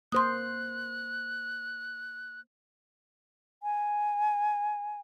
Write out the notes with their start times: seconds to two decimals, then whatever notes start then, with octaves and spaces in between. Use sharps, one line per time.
0.12 A#3 C5 C6 D#6 F#6
3.63 G#5